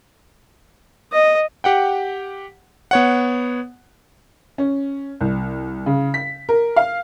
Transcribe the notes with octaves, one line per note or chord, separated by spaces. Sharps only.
D#5
G4 F#5 G5
B3 C#5 F#5
C#4
C2
C#3
B6
A#4
F5